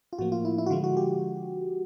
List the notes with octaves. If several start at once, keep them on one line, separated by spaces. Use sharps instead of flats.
F4
A2 F3 A#3 F#4
F4
E4
E4
F#4
D3 F3 G#3 F4
F#4
G4